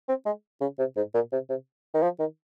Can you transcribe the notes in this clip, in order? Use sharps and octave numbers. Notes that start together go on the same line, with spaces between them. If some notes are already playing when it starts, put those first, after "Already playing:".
C4
G#3
C#3
C3
G#2
A#2
C3
C3
D#3
F3
D#3